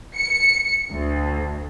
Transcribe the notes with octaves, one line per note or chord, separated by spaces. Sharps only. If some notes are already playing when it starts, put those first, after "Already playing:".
C#7
D2